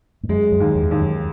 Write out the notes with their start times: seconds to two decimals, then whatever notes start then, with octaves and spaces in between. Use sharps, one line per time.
0.23 G#2
0.29 F#2 G#3
0.52 F#2
0.60 D#2
0.75 E2
0.91 D#2
0.99 F#2